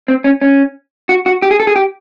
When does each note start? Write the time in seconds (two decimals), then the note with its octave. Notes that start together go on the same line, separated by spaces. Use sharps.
0.08 C4
0.24 C#4
0.41 C#4
1.09 F#4
1.26 F#4
1.42 G4
1.51 G#4
1.60 A4
1.67 G#4
1.76 G4